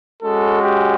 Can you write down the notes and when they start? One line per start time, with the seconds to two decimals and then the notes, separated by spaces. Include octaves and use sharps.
0.22 G#3 C#4 F#4 A4
0.62 G4